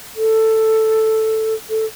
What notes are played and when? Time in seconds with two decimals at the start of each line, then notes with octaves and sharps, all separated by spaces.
0.17 A4
1.70 A4